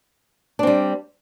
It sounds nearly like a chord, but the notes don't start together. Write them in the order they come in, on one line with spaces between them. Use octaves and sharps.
D4 C4 G3